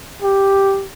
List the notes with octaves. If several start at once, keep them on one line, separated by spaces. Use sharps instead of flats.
G4